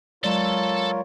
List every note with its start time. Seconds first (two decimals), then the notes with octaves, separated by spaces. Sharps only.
0.24 F#3 G#3 F4 A4 A#4 C#5 D5 A5